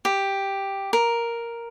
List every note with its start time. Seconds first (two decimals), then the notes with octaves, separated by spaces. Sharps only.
0.05 G4
0.93 A#4